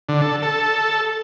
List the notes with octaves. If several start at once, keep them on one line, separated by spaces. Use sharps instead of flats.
D3
A4
A4